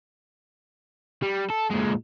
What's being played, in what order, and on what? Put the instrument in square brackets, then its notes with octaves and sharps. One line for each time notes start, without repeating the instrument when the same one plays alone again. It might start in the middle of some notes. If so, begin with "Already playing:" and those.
[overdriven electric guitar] G3
A4
A#2 G#3